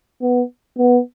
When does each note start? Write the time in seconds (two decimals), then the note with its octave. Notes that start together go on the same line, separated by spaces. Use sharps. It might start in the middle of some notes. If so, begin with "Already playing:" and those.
0.21 B3
0.78 B3